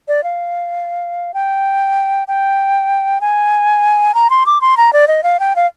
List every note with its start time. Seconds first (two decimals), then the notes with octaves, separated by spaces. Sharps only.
0.08 D5
0.24 F5
1.34 G5
2.28 G5
3.21 G#5
4.14 A#5
4.30 C6
4.46 D6
4.61 C6
4.77 A#5
4.93 D5
5.08 D#5
5.23 F5
5.40 G5
5.56 F5